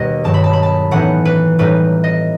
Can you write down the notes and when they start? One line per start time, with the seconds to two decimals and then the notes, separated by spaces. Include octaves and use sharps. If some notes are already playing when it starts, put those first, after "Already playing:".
Already playing: D#2 B2 D#3 G3 B3 B4 D#5
0.24 G2 D#3 F#3 A5
0.34 B5
0.44 A5
0.53 B5
0.63 A5
0.91 A2 E3 B3 D#4 F#5
1.25 B4
1.59 A2 G3 D#4 B4
2.04 D#5